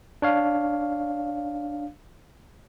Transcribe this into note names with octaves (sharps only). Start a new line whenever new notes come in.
D4 C#5 F5